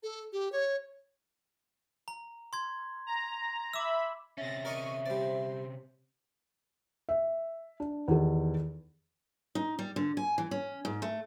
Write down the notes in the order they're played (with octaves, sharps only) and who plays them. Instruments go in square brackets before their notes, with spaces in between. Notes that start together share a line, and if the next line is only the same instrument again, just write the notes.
[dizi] A4
G4
C#5
[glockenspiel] A#5
C6 G#6
[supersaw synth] A#5
[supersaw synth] E5 B5 [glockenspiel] D6 E6
[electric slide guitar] C3 C#4 [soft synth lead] E5 [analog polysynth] A6 A#6
[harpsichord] A#4 D5 D#5 [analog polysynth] C#6 D#7
[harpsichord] G3 D5 [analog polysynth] C5
[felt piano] E5
D4
E2 D#3 G4 A4
[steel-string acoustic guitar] D#4
G3
D3
G#5
E3
C#4
G#2
A3